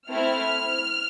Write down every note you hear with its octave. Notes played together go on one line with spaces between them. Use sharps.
A3 C4 E4 F6